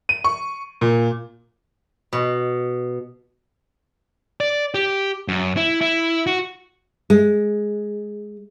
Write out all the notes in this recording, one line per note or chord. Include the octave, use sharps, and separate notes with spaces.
D#7
C#6
A#2
B2
D5
G4
F#2
E4
E4
F#4
G#3